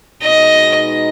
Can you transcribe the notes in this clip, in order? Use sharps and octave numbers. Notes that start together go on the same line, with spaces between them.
B2 G#3 B3 D#4 G#4 D#5